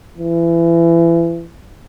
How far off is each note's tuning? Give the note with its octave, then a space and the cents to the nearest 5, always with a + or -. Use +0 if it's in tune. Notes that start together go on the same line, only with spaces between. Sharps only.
E3 +30